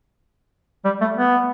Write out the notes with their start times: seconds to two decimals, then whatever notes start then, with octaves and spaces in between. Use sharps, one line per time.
0.85 G3
1.01 A3
1.17 B3